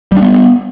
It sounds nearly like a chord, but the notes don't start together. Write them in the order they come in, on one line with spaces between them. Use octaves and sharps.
G3 D4 B3